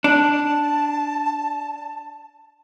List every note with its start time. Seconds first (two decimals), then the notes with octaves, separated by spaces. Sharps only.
0.04 D4 A5